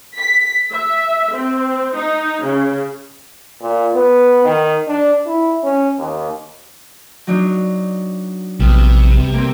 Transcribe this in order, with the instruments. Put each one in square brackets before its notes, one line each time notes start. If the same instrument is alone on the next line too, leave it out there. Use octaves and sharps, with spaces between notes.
[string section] B6
E5
C4
D#4
C#3
[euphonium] A#2
B3
D#3
D4
E4
C#4
D#2
[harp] F#3 D4 D#4
[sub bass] A#1 [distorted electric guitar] C3 [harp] G3 B3
[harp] A#3 C4